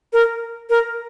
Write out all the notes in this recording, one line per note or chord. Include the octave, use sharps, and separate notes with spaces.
A#4
A#4